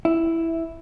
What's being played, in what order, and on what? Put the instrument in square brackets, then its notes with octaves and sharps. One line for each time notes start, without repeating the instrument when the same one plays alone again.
[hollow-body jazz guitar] E4